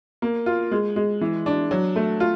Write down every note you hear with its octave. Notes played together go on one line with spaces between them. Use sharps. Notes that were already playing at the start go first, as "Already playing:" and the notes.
A#3
F4
G#3
G#3
E3
D4
F#3
A3
F4